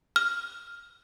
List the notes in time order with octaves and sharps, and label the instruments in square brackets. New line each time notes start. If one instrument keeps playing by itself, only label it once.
[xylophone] F6